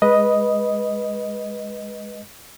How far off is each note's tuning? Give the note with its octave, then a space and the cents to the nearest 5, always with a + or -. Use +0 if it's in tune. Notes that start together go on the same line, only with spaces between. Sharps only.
G#3 +0 B4 -10 D#5 +0